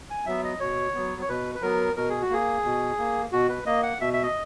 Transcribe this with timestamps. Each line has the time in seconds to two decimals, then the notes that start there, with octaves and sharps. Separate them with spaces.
0.10 G#5
0.26 F#3 B3 E5
0.44 D#5
0.60 B2 C#5
0.94 F#3 B3
1.21 C#5
1.29 B2 B4
1.55 B4
1.62 F#3 B3 A#4
1.96 B2 A#4
2.10 G#4
2.22 F#4
2.30 A#3 G#4
2.65 B2
2.99 A#3
3.32 B2 F#4
3.49 B4
3.66 A#3 D#5
3.83 F#5
4.00 B2 E5
4.14 E5
4.23 D#5